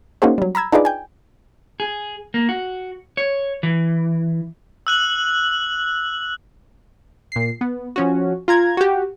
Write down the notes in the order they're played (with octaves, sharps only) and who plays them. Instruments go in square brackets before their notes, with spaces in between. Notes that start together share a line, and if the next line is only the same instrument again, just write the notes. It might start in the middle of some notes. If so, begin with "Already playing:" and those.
[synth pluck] A#3 C#4 D#4 F#4 G#4 C5
F#3 G3
A#5 B5 E6 G#6
D4 D#4 F4 G#4 B4 D5
G5 G#5
[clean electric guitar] G#4
A#3
F#4
C#5
E3
[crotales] E6 F#6 F#7
[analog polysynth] A#2 C7
B3
F3 C#4 F#4
F4 A#5 G#6
F#4 G4